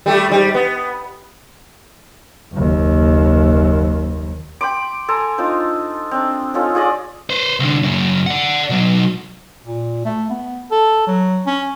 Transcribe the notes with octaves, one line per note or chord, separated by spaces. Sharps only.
G3 A3 G4
G#2 G3
B3
F#1 D#2
G5 B5 C6 D6
A4 G#5 A#5 C6
D4 D#4 F4 C5
C4 D4
C#4 D#4 F4 A4
F4 G#4 D5 D#5
B4 C5
C2 D3
F#2 C#3
D5 F#5
B2 F#3
A#2
A3
B3
A4
F#3
C#4